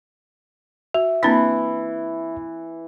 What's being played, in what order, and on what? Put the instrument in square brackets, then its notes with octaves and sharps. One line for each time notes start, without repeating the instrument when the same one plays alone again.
[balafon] F#4 [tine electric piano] E5
[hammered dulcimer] E3 [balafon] A#3 C4 D4